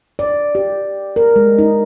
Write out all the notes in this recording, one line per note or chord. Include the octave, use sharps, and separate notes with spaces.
D5
G4
A#4
G#3
D#4